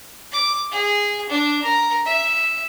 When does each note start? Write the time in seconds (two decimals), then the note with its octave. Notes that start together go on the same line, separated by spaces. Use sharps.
0.32 D6
0.71 G#4
1.29 D4
1.63 A#4
2.05 E5